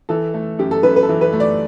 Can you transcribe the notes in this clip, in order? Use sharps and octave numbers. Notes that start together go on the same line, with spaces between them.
E3 A4
A3
F#2 G4
A4
F#2 B4
B4
A4
E3
B4
A3
D5